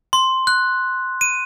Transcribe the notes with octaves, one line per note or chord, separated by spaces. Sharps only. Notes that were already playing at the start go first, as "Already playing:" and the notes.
C6
F#6
D#7